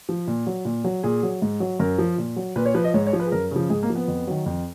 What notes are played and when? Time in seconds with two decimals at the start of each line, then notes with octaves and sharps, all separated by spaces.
0.09 F3
0.28 A#2
0.47 F#3
0.65 A#2
0.84 F#3
1.03 A#2 G#4
1.23 F#3
1.42 G#2
1.60 F#3
1.80 F#2 A#4
1.98 F3
2.18 A#2
2.36 F#3
2.56 A#2 B4
2.66 C#5
2.75 F3 B4
2.84 D#5
2.94 G#2 C#5
3.07 C#5
3.13 F3
3.20 B4
3.26 G#4
3.32 F#2 A#4
3.51 C#3 F3
3.70 G#2 G#4
3.83 A#3
3.90 F3
3.95 B3
4.08 F2
4.27 D#3 F#3
4.46 F2